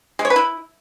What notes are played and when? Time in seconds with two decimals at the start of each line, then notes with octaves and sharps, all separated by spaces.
0.19 G#3
0.25 C#5
0.30 B4
0.36 E4